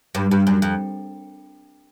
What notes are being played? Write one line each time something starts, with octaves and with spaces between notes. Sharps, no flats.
G2
G2
F#2
F2